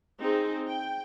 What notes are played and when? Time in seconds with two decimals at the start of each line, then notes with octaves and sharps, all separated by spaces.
0.20 C4 D#4 G#4
0.68 G5